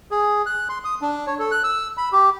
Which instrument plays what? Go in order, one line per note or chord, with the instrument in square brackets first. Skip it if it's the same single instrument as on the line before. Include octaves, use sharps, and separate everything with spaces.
[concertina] G#4
F#6
C6
D#6
D4
C#5
A4
F#6
E6
B5
G4